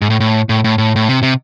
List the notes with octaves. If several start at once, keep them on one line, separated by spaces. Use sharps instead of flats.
G#2
A2
A2
A2
A2
A2
A2
C3
C3